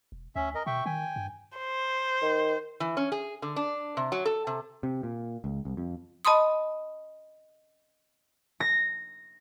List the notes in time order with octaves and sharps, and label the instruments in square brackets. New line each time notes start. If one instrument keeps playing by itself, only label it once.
[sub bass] E1
[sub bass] D2 [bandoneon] C#4 E5
[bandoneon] A#4 D#5
[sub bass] B2 [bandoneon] E5 G5 C#6
[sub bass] D#3 [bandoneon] G5 G#5
[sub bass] G2
[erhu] C5
[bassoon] D#3
[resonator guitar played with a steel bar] E3
C#4
G#4
D3
D4
C3
F#3
A4
C3
[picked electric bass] C3
A#2
C#2
C2
F2
[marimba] D#5 A5 B5 C6 D#6
[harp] A#6